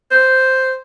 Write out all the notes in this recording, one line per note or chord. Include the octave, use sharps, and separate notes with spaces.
C5